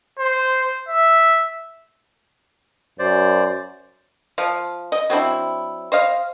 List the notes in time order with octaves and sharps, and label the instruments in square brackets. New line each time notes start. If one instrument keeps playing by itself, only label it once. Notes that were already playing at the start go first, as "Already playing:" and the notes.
[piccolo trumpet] C5
E5
[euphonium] F#2 [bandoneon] C5 D5
[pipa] F3 F5
D#5
F#3 C4 D4 E4
C5 D#5 F5